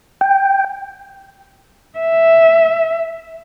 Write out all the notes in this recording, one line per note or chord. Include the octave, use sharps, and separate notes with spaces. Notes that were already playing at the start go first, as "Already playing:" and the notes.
G5
E5